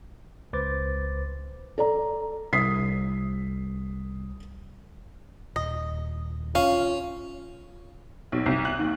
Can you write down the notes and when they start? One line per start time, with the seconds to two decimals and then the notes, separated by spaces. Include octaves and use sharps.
0.53 C#2 B4 C5 D6 A6
1.78 A4 D5 A#5
2.53 C2 D#6 B6 C7
5.56 D#1 D#5
6.55 C#4 F4 F5
8.32 B1
8.46 C2
8.65 F#6
8.79 D#2